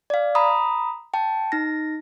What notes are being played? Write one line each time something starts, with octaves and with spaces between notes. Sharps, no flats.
D5 F5
A#5 B5 D#6
G5 A5
D#4 A#6